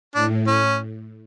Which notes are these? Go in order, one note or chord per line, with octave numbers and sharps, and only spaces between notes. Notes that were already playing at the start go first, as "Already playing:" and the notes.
A2 D4
C#4